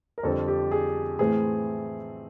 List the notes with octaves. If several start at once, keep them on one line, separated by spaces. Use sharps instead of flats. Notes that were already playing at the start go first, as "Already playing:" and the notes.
A#4
F2 D3 G3 C4 A4
G4
G#4
A2 E3 A3 C4 G#4